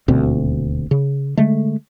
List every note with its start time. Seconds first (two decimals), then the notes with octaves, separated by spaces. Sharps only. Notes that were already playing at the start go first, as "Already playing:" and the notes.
0.08 D#1 D2 B2 C4
0.91 C#3
1.37 D3 G#3 A3